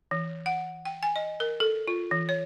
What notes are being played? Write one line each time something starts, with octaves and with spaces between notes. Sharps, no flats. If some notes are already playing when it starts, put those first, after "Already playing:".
E3
F#5
G5
G#5
D#5
A#4
A4
F4
E3
C#5